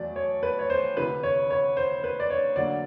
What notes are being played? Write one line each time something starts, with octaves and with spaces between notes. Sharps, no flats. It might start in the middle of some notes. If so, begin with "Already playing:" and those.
Already playing: E2 F#3 A3 D5
C#5
B4
C#5
C5
D2 C3 E3 B4
C#5
C#5
C5
B4
D5
C#5
D2 D3 F#3 A#3 D5